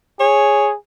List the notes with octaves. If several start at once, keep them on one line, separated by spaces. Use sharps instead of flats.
G#4 C#5